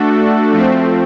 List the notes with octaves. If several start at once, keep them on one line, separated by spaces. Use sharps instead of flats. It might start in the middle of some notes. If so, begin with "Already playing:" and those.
Already playing: A3 D4 F#4 A4
F3 A3 C4